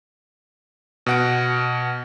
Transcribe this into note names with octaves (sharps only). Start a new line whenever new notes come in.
B2 F#5 D7